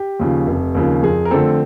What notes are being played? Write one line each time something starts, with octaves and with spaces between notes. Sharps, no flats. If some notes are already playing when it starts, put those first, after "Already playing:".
Already playing: G4
D#2 C#3 F3
F1
D#2 C#3 F3
F2 G#4
A#4
D3 F3 A3 C4 A4